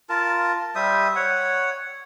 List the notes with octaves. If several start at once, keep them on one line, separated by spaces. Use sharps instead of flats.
F4 A#4 A5
G3 C5 E5 D#6
C#5 F#5